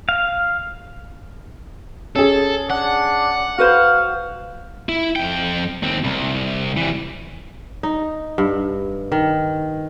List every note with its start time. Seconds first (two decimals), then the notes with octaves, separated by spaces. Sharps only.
0.09 F5
2.16 C#4 G#4 A4
2.70 D4 F#5
3.58 F#4 B4 C5 F5
4.89 E4
5.16 F2 G5
5.83 D#2 C4
6.04 C2
6.77 E3 G3
7.83 D#4
8.38 G2
9.12 D#3